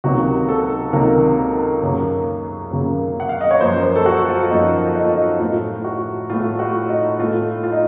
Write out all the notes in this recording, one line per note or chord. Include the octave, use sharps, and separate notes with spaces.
C#2 C3 D#3 F#3 A#3 F#4
A4
C#2 C3 D#3 F#3 A#3 A#4
F#2 C#3 F#3 A#3
F#2 C#3 F#3 A#3
F#5
F5
D#5
C#5
F#2 F3 A#3 C5
C5
A4
F#4
F4
F#2 F3 A#3 D#4
D#4
F4
D#4
A2 A3 F4
F#4
A2 A3 F4
F#4
D#4
A2 A3 F4
F4
D#4